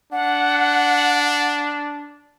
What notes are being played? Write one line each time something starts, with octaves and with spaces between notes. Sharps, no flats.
D4 F#5